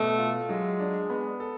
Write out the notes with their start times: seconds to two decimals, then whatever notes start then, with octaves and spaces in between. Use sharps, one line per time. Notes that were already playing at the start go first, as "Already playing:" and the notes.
Already playing: B2 A3
0.18 F4
0.49 F#3 G#3
0.79 D4
1.10 B3
1.40 A4